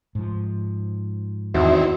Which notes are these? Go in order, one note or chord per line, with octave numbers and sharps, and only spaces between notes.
G#2 F3
E2 D#3 C4 E4 F#4